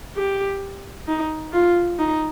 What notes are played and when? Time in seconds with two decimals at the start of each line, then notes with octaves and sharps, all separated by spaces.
0.16 G4
1.08 D#4
1.53 F4
1.99 D#4